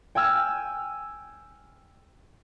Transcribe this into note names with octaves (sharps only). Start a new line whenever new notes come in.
G5 G#5 E6 F6